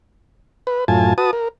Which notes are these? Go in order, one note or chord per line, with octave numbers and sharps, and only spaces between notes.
B4
F#2 A2 F4 G#5 A5
F#4 B4 A5 D#6
A#4